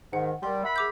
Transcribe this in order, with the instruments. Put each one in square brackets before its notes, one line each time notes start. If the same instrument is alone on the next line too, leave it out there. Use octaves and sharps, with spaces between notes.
[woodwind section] G#2 D#3 [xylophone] F#5
[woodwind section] G3 [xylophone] A#4 C6
[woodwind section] E5 F#5 B5
[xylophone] G#4 D6 G6